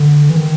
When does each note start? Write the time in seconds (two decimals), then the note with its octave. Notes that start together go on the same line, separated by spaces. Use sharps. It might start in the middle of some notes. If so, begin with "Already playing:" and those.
Already playing: D3
0.30 E3
0.36 D#3